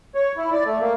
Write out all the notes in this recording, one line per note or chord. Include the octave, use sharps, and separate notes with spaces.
C#5
E4
D5
A3
A#3